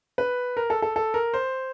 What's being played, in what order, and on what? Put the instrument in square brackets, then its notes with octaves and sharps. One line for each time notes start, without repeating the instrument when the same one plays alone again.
[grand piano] B4
A#4
A4
A4
A4
A#4
C5